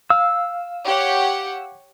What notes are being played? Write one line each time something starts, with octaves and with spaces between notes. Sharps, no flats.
F5 E6
G4 C#5 F#5